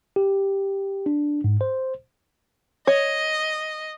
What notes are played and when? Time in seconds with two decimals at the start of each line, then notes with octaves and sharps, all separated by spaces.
0.16 G4
1.06 D4
1.44 G#2
1.61 C5
2.87 C#5 D#5